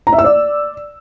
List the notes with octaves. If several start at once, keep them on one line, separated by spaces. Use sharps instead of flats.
A#5
E5
E6
D5